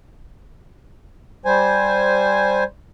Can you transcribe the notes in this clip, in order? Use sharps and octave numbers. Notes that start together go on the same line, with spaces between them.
G3 C5 G#5